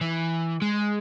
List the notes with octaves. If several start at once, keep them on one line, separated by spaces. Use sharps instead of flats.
E3
G#3